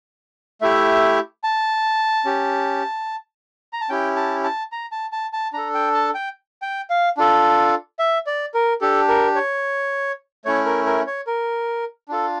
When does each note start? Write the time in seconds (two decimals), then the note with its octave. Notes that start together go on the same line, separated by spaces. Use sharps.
0.61 A3 E4 G4 E5
1.44 A5
2.25 C#4 G4
3.73 A#5
3.81 A5
3.89 C#4 E4 G4 G5
4.16 A5
4.44 A5
4.72 A#5
4.92 A5
5.12 A5
5.33 A5
5.53 D4 A4 A#5
5.74 G5
5.94 A5
6.14 G5
6.62 G5
6.90 F5
7.17 D4 F4 A4
7.99 E5
8.26 D5
8.54 A#4
8.81 D4 G4 A4
9.08 A#4
9.35 C#5
10.45 A3 C#4 E4 C#5
10.66 A#4
10.86 A#4
11.07 C#5
11.27 A#4
12.09 D4 F4 A4